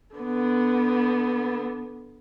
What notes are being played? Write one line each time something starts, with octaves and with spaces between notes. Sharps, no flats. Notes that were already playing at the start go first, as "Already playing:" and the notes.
D3 B3